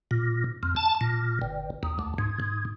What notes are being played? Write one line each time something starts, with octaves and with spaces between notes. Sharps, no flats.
A#2
F2
A5
A#2
G1
D#2
D2
G#2
G#2